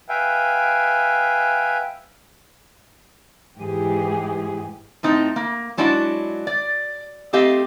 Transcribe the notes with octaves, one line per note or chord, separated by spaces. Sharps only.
B4 E5 F5 G5 G#5
G#2 E3 G4 G#4
A2 C4 D#4
A#3
F#3 G#3 D4 E4 F#4
D5
A3 C4 G4 D#5 F5